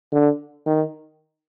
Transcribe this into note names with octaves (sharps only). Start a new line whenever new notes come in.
D3
D#3